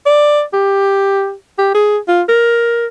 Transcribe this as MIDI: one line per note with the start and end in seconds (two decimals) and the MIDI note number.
0.06 0.42 74
0.53 1.33 67
1.58 1.71 67
1.75 1.97 68
2.08 2.22 65
2.29 2.87 70